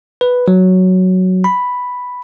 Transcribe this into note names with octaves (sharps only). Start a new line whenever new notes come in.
B4
F#3
B5